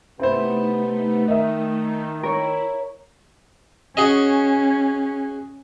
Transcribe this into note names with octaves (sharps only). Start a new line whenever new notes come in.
C3 A3 B3 C4 D#4 E4 C5
D#3 D#5 E5
E4 A#4 C#5
C#4 F#4 G#4 D#5